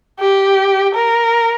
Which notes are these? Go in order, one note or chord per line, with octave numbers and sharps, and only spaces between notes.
G4
A#4